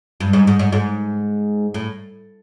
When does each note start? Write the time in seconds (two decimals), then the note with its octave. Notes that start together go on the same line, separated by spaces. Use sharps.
0.20 G2
0.33 G#2
0.47 G#2
0.59 G#2
0.72 G#2
1.74 A2